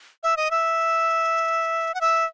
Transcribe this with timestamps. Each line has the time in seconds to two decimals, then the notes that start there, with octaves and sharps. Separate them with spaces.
0.23 E5
0.37 D#5
0.51 E5
1.94 F#5
2.01 E5